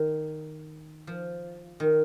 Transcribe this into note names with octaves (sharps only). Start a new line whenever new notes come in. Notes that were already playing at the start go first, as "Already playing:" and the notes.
Already playing: D#3
F3
D#3